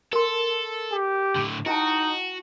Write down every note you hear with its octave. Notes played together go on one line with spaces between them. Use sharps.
A4 A#4 C6
G4
A2 D3
D#4 E4 F#4 G5 A5